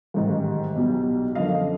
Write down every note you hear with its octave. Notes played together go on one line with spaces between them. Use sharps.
A1 G#2 D#3 G3
B1 B2 G3
F#2 D3 F3 A#3 D#5 F5